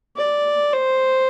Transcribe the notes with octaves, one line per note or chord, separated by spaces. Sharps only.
D5
C5